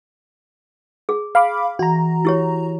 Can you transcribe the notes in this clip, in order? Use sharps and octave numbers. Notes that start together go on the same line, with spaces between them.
G#4
F5 B5 D6
E3 F#4 A#5
E4 G4 C#5